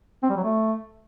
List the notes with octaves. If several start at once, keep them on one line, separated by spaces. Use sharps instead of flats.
C4
G3
F#3
A3